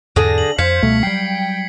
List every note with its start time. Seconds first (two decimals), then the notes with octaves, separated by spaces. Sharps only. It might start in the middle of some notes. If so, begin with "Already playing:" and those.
0.16 E2 G#2 D3 G#4 A#6
0.38 F#7
0.59 F2 C5 F5 G#6 B6 C#7
0.83 C#2 B2 G3 A3
1.03 F#3 G3 G5 C7